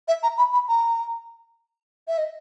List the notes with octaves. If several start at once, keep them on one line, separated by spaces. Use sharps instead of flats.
E5
A#5
B5
B5
A#5
E5
D#5